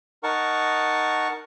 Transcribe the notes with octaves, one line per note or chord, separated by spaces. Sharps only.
D#4 A#4 F#5 A5 C#6